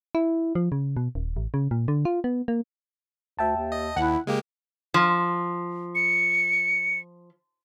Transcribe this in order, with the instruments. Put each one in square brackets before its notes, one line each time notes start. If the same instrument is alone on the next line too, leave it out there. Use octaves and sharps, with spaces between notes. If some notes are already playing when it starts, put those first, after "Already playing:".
[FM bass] E4
F3
C#3
B2
D#1
A1
C#3
A#2
D3
F4
B3
A#3
[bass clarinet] D2 [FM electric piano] E5 G5 A5
[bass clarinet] D#2
[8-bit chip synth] D#5
[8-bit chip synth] D#2 [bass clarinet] E4 [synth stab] F#5
[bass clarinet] C#3 [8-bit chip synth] G#3 A#3 G4
[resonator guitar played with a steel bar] F3
[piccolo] C#7